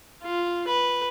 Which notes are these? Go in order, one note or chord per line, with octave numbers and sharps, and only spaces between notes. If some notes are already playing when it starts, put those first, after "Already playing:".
F4
B4